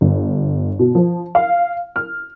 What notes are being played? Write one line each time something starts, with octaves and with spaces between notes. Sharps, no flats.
G1
B2
F3
F5
F6